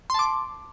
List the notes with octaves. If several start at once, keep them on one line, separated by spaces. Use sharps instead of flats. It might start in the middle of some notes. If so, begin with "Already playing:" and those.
A5 C6 D6